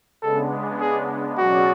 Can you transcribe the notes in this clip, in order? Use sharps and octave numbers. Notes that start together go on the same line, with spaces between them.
C#3 G#3 B3 D4 A4
G#4
B2 F#3 C#4 F#4 G#4 D5